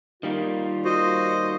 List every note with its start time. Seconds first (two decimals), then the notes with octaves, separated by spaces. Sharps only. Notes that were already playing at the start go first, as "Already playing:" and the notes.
0.23 D#3 G3 A#3 F4
0.85 F#4 C5 D#5